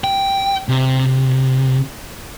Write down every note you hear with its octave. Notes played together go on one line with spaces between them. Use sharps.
G5
C3